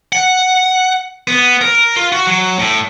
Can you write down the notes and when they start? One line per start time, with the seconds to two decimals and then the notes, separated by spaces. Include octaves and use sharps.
0.12 F#5
1.28 B3
1.61 A#4
1.96 F4
2.12 F#4
2.27 F#3
2.59 A2